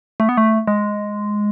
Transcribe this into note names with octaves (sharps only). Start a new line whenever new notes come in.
A3
B3
A3
G#3